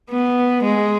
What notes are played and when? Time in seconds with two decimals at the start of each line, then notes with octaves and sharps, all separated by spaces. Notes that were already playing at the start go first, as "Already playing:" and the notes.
0.11 B3
0.64 G#3